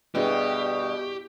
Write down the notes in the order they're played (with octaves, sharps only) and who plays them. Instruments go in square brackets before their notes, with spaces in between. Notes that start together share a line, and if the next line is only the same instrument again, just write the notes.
[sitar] G2 B2 [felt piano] B3 E4 G#4 [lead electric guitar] G4 [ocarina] D5